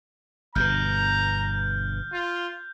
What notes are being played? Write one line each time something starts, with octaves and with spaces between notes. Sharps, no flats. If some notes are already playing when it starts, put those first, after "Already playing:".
G1 G2 B2 A#5 F6 G6
F4